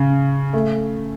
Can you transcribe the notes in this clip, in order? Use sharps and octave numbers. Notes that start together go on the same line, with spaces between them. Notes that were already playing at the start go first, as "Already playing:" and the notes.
Already playing: C#3
A3